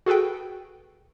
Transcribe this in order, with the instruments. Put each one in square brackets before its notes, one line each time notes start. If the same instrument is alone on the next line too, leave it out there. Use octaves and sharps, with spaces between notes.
[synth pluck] F#4 G#4 A4 B4 G5